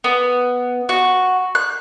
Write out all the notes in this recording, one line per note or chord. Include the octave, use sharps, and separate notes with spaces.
B3
F#4
F#6